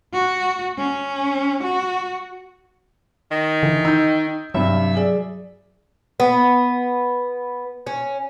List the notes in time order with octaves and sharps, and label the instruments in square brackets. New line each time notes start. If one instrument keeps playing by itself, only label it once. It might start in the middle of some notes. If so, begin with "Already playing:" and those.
[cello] F#4
C#4
F#4
[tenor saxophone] D#3
[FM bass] D3 [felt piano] E3
[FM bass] D#4 [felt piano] E6 G6
[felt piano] G2 C3 [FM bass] F#3 [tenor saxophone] E5
[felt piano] G#4 D5
[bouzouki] B3
C#4